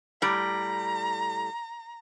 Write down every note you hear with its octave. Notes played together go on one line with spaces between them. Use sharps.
A2 G3 A#5